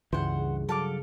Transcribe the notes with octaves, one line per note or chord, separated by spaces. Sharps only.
C#2 G2 C#3 E3 C5 F#5
F#3 A4 F5 D6